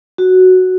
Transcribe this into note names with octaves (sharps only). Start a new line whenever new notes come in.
F#4